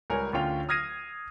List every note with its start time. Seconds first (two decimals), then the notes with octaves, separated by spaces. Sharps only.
0.10 C#2 G3 A#4 C#5 G#5
0.33 D2 C#4 F4 G5 F7
0.69 D#6 F6 G#6 A#6 C7 D#7